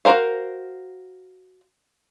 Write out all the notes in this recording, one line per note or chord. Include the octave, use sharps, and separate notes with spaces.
F#4 A4 A#4 C5 F5